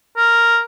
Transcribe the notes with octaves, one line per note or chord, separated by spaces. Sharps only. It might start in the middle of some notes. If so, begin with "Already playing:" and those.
A#4